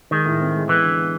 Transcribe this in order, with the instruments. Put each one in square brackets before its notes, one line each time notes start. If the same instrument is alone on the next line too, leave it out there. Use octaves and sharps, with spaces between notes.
[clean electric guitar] D#3 [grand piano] G#3
[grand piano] A2
C4
G#3
[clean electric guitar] E3 [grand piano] B3
[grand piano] D3
B3